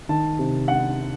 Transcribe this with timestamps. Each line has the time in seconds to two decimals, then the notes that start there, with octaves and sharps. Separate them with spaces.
0.09 D#3 A5
0.39 C3
0.68 F#5